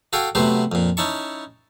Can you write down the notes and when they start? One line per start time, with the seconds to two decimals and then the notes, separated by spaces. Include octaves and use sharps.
0.13 F#4 A4 F5 G5 G#5
0.35 C3 F#3 A3 B3 C5
0.72 F2 A#2
0.97 C#4 D#4 E4 A5 C#6